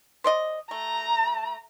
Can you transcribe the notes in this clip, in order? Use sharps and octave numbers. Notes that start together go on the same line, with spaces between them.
C5 D5 D#5
A3 A#5